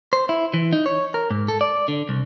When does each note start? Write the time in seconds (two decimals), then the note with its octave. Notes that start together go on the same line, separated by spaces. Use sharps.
0.13 C5
0.29 E4
0.54 E3
0.73 D#4
0.86 C#5
1.14 A#4
1.31 G#2
1.48 A4
1.61 D5
1.88 D3
2.09 C2